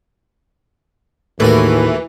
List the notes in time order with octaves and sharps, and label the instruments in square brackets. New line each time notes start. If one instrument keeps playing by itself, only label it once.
[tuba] D#2 [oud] A2 B4 [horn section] E3 [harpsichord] A3 F#4 A#4